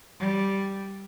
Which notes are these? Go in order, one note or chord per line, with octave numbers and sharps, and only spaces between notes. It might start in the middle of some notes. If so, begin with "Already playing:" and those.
G3